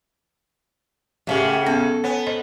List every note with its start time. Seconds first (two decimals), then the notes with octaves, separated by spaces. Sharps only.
1.27 F#2 C#3 A3 C#4 G4
1.52 G5
1.66 B3 C#4 A4
2.04 B3 C#5 G#5
2.27 C5 D#5